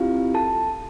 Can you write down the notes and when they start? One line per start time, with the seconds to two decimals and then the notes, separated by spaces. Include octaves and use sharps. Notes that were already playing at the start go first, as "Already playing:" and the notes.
Already playing: C4 E4 F4 G4 F5
0.34 A4 A5